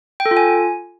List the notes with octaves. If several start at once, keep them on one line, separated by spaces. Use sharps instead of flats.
G5
A4
F4
G#5